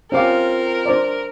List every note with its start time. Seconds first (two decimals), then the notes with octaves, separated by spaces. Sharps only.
0.12 C4 C#4 F4 G4 A#4 F5 D6
0.86 D4 C5 D5